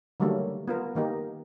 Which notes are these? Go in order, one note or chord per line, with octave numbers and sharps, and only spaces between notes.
D3 D#3 F#3 G3 A3 A#3
B3 F4 A#4
D#3 A#3 D#4 G4